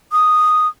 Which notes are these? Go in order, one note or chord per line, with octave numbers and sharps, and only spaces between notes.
D#6